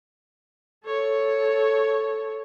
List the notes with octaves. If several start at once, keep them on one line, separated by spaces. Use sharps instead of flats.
A4 C#5